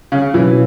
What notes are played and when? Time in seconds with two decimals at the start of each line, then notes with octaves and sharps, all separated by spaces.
0.12 C#3
0.34 B2 E3 F#3 C#4 E4